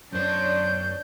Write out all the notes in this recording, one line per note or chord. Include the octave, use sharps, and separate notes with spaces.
F#2 D4 C5 C#5 D#5 G6